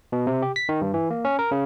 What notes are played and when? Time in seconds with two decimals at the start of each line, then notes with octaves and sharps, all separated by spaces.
0.12 B2
0.27 C3
0.42 G4
0.56 B6
0.69 D#3
0.81 G2
0.94 E3
1.10 A#3
1.25 C#4
1.39 A#4
1.51 C#3